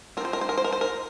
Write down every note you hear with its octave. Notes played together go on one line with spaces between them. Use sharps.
F3 C4 A#4 C5
A#4
C5
A#4
C5
A#4
C5
A#4